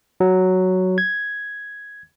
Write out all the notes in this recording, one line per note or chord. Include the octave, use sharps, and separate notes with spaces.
F#3
G#6